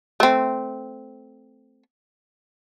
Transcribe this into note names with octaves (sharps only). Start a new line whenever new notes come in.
A3 C4